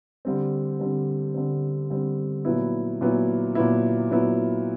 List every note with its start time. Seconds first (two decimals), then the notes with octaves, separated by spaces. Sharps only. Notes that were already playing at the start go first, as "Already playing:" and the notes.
0.25 D3 G3 C4
0.80 D3 G3 C4
1.34 D3 G3 C4
1.90 D3 G3 C4
2.45 A#2 F#3 B3 E4
3.01 A#2 F#3 B3 E4
3.55 A#2 F#3 B3 E4
4.10 A#2 F#3 B3 E4